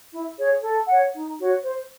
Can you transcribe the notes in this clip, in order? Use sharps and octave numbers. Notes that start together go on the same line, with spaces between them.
E4
G#4 C#5
A4
C#5 F#5
D#4
F#4 C#5
C5